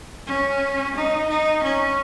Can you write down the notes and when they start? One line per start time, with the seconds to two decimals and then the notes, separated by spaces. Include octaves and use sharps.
0.27 C#4
0.95 D#4
1.29 D#4
1.63 C#4